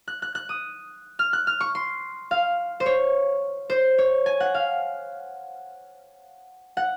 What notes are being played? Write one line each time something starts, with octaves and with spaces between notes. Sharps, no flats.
F#6
F#6
F#6
D#6
F6
F#6
F6
C#6
C6
F5
C5
C#5
C5
C#5
G#5
F#5
F5
F#5